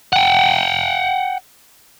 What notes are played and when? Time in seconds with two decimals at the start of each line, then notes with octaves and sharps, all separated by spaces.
0.13 F#5 G5